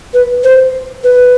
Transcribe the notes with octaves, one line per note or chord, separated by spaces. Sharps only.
B4
C5
B4